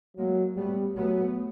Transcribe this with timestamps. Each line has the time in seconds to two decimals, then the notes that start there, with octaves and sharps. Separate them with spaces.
0.17 F#3 G#3 A#3
0.56 G3 A3 B3
0.96 F#3 A3 B3